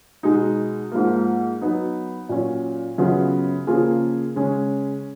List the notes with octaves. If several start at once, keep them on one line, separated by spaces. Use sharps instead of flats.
B2 G#3 D#4
G#2 F3 A#3
F#3 B3 D#4
A#2 F#3 C#4
F#2 C#3 F#3 B3 F4
C#3 F3 A#3 F4 G#4
C#3 G#3 C#4